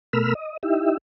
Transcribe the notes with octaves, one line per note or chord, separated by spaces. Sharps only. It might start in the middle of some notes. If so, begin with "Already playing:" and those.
B2 A3 A#4 B5 E6 F6
D#5
D#4 E4 G4 E5